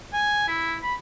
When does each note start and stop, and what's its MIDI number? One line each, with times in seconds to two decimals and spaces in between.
0.13 0.47 80
0.48 0.75 64
0.83 0.93 83